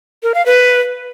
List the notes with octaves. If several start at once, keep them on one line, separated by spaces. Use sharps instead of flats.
A#4
F5
B4